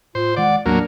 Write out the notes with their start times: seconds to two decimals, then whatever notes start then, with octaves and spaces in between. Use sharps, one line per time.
0.15 A2 F4 C5
0.36 D#1 D#3 G#3 D5 F#5
0.66 D#2 A2 F#3 A#3 B3 D4